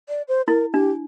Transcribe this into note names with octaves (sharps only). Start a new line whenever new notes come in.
D5
C5
E4 A#4
D4 G4